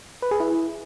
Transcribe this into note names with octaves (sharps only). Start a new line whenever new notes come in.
B4
G#4
E4